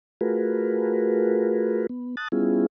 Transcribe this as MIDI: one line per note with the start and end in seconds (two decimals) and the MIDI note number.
0.21 1.87 57
0.21 1.87 65
0.21 1.87 66
0.21 1.87 68
0.21 1.87 70
0.21 1.87 71
1.89 2.15 59
2.17 2.28 81
2.17 2.28 87
2.17 2.28 90
2.17 2.28 93
2.32 2.66 55
2.32 2.66 59
2.32 2.66 61
2.32 2.66 64
2.32 2.66 65
2.32 2.66 68